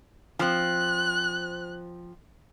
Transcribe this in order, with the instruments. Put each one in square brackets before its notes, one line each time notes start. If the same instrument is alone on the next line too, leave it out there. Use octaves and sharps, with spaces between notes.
[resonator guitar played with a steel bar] F3 C4 [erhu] F#6